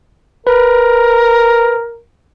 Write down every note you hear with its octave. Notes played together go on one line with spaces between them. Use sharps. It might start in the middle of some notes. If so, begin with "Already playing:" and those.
A#4 B4